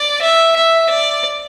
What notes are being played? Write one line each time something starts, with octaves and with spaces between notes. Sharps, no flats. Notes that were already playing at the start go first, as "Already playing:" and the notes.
Already playing: D5
E5
E5
D5